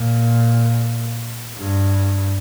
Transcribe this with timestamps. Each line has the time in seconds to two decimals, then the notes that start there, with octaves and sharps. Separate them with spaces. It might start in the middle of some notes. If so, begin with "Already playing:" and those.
Already playing: A#2
1.58 G2